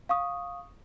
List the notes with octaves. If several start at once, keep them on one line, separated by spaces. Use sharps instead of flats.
F5 C#6 D#6